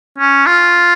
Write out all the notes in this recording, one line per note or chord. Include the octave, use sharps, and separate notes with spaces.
C#4
F4